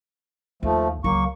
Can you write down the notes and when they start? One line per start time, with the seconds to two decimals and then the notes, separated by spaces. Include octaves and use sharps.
0.63 D#2 F3 A3
1.04 C#2 F#3 A#3 C#6